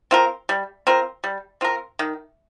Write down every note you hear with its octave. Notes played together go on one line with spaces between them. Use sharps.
C4 F4 A#4
G3
C4 F4 A#4
G3
C4 F4 A#4
D#3